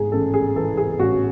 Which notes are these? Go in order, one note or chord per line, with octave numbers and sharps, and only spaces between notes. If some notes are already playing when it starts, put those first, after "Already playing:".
Already playing: G#2 G#4
A1 A4
G#4
E3 A4
G#4
A1 F#4